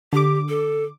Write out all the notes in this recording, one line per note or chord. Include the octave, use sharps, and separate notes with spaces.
D3 G4 D6
A4